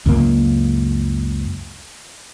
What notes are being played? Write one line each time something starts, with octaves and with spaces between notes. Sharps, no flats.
C#2 F#2 A#3